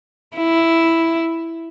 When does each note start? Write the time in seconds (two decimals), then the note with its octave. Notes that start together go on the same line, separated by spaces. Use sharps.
0.37 E4